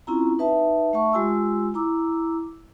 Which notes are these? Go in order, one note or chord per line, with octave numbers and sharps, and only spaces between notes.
C4 C#4 E4 F4 A#5
D#4 B4 E5 A5
A3 E5 F#5 A5 C#6
G#3 F4 G4 G#5 C6 E6
E4 A#5 D6 E6